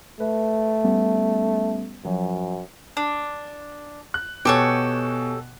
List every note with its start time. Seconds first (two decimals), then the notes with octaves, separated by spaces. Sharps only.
0.20 A3 B4
0.84 G3 B3 C#4
2.05 F#2 F3 F#3
2.97 D4
4.14 F#6
4.45 B2 G4 A4 C#5 G#5